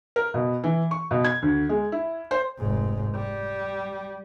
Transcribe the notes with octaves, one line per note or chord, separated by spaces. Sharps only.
A#4
B2
E3
C#6
B2
G#6
D2
G#3
E4
C5
F1 G#2
G3